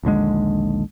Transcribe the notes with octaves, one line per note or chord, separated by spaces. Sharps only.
A#1 D#2 D3 G#3